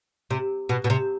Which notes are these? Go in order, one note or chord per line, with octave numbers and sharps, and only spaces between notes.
C3
B2
B2
C3